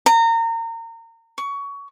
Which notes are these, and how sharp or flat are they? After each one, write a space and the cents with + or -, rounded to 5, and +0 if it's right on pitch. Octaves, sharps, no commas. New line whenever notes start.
A#5 -30
C#6 +20